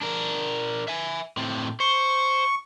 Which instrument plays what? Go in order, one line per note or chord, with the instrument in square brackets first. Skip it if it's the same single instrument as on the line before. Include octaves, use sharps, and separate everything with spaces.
[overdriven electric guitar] D4 A#4
E5 G#5
A2 C4
[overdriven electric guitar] C5 [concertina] C#6